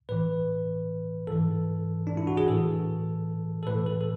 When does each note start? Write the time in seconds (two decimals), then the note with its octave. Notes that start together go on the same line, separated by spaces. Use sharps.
0.09 A2 E3 B4
1.27 G#2 E3 A4
2.07 D4
2.17 E4
2.27 F#4
2.37 G#4
2.47 A2 E3 A4
3.63 A4
3.67 A2 E3 B4
3.86 A4
4.01 A4